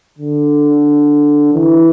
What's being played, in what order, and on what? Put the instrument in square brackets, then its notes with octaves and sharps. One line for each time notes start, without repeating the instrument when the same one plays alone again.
[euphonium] D3
E3